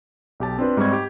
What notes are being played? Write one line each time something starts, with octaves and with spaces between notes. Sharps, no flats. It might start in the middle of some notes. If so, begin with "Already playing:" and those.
B1 G4 A5
C4 D4 F4 B4
G#2 G3 C4 C#6 G#6
G4